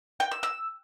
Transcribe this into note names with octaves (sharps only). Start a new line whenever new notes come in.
G5
E6
E6